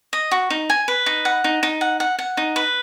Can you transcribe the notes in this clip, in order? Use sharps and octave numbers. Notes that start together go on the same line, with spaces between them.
D#5
F#4
D#4
G#5
B4
D#4
F#5
D#4
D#4
F#5
F#5
F#5
D#4
B4